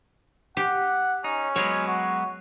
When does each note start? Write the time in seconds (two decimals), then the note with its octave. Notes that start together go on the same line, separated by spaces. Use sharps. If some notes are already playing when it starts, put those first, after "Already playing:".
0.57 G4 F#5
1.24 C#4 D#4
1.56 F#3 G#3 B3 C#5
1.87 F#4